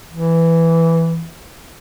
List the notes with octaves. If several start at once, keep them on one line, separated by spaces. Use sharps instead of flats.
E3